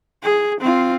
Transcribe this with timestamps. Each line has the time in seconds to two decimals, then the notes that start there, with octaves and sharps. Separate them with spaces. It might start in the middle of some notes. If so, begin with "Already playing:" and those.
0.23 G#4
0.60 C4 F4